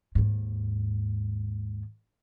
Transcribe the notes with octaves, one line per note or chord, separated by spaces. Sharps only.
D#2 G#2